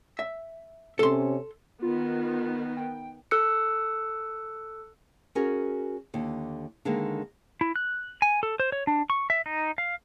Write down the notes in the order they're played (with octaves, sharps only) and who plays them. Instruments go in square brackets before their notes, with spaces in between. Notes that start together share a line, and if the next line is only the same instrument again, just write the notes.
[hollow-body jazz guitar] E5
[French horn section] C3 C#4 [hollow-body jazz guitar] A4 C6
[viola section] D#3 B3 [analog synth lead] F4
[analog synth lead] G5
[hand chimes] A4 E6 F#6 C#7
[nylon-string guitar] C#4 F#4 G#4 A#4
D#2 D3
D3 D#3 G#3 A#3 C4
[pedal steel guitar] E4
F#6
G#5
A4
C5
C#5
D4
C#6
E5
D#4
F5